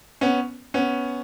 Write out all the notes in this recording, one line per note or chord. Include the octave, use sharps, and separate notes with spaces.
B3 C#4
B3 C#4